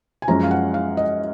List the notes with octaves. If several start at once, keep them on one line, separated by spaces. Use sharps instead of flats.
G#5
F#2 F3 G#3 C#4 A#5
F5
F#5
F5
D#5